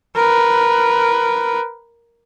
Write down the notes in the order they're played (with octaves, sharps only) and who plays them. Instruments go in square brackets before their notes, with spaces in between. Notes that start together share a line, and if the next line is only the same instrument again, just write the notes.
[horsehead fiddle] A#4 B4